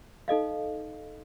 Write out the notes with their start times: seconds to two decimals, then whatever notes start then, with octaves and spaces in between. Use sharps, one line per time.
0.28 D#4 A4 D#5 F5